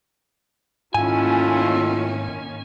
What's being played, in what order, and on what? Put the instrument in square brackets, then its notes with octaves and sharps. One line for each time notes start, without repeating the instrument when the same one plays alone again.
[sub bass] G#2 [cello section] D#3 A#3 C#4 [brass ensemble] A3 E4 F4 [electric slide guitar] G#5